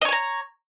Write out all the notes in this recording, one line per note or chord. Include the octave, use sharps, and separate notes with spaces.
C#5 D#5 G#5 A#5